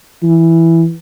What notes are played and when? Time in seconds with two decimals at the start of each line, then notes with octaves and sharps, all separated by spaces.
0.23 E3